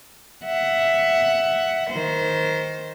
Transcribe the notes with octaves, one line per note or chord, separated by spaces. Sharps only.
E5 F#5
D#3 C5